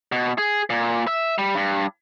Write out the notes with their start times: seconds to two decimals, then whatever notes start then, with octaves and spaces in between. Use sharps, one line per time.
0.12 B2
0.38 G#4
0.70 A#2
1.07 E5
1.38 G3
1.55 G2